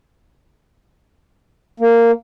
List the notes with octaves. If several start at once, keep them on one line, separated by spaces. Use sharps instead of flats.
A#3